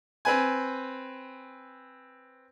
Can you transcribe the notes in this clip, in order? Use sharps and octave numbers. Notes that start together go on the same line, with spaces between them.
C4 B4 G#5